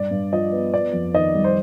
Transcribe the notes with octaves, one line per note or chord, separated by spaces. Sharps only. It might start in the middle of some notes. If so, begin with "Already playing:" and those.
Already playing: G2 D5
G2
F3 D#5
B3
B3 D5
F2
D#3 D#5
G3
C5